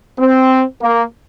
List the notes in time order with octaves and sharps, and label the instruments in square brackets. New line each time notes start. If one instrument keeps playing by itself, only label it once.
[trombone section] C4
A#3